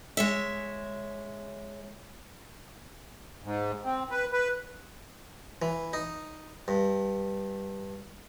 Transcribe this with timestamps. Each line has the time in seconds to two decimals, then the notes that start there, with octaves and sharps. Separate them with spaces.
0.17 G#3 C#5 E5
3.44 G#2
3.85 C4
4.10 B4
4.32 B4
5.62 E3
5.93 D#4
6.68 G2